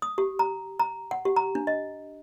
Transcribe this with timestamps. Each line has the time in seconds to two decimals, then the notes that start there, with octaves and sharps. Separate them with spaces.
0.02 D#6
0.18 G4
0.39 A#5
0.80 A#5
1.11 F#5
1.25 G4
1.36 A#5
1.55 D4
1.67 D#5